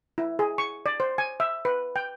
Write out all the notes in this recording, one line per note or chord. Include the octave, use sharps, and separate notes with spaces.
E4
G#4
C#6
D5
C5
G#5
E5
B4
G5